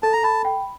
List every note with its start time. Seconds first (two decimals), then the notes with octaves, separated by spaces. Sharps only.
0.03 A4 A5
0.13 A#5
0.23 A5 B5
0.45 G5